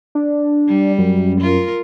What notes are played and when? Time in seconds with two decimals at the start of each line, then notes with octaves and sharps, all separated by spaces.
0.15 D4
0.68 G3
0.98 F#2
1.41 F4 A#4